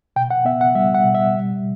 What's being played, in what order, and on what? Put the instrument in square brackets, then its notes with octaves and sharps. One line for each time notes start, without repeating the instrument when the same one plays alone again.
[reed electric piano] B2 G5
F#5
B3 E5
F#5
G3 E5
F#5
B2
E5
G3